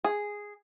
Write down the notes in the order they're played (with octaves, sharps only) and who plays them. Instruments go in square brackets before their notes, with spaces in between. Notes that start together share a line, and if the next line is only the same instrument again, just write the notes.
[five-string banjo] G#4